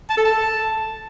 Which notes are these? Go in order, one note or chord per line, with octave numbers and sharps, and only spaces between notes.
A5
A4
A5